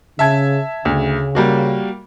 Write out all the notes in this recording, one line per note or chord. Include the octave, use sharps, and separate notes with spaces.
C#3 E5 A5 G#6
D2 C#3
G3 A#3 F#4